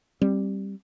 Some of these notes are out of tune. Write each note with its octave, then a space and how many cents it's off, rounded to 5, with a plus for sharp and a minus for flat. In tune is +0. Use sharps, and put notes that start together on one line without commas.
G3 +0 C4 +30